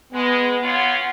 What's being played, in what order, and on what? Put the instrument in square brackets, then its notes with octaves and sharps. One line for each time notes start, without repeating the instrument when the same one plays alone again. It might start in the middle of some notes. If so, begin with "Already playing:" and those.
[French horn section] G#3 [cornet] B3
[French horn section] B3 C#4 F4 [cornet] F#5